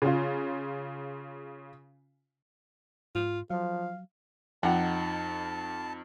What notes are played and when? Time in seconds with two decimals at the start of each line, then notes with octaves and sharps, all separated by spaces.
0.02 C#3 F4
3.15 G#2 F4
3.50 F3 F#3 F5
4.63 F2 F3 D#4 F4 F#5 G5 A5